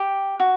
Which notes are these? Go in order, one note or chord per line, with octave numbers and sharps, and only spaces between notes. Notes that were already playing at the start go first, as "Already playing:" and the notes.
Already playing: G4
F#4